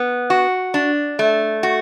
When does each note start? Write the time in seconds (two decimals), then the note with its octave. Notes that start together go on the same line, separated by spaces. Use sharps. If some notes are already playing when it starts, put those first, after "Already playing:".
Already playing: B3
0.30 F#4
0.74 D4
1.19 A3
1.63 F#4